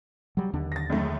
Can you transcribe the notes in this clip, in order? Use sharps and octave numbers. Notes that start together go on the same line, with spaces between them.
F#3 G3
D#2 D3 D4
A6 A#6
C#2 F#2 A3